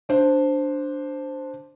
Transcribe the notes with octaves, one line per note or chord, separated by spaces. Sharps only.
D4 C5